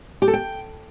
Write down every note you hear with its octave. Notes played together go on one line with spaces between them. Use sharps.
G4
A4
G5